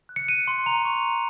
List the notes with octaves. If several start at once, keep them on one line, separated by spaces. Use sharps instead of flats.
F#6
C#7
F#6 D#7
C6
A#5 F7
C#6
A#5